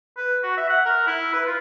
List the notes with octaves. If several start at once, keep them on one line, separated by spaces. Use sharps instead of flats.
B4
F#4
E5
F#5
A#4
E4
B4
F4